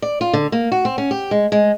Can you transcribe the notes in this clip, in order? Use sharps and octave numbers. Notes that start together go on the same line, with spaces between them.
D5
F4
D3
A#3
F#4
C4
C#4
G4
G#3
G#3